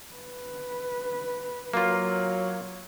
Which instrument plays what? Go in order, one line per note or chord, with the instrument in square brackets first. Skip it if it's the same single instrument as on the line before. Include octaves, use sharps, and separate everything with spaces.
[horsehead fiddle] B4
[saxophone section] F#3 [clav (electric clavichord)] A#3 F4